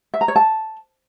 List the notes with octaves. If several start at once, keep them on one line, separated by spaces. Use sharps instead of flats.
E5
A#5
C#5
A5